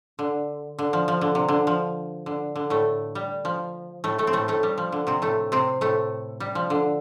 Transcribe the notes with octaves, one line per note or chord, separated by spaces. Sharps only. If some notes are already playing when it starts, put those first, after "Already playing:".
D3
D3
F3
F3
D3
C3
D3
F3
D3
D3
A2 A3
G3
F3
A2 A3
A2 A3
C4
A2 A3
A2 A3
G3
F3
D3
C3 C4
A2 A3
C3 C4
A2 A3
G3
F3
D3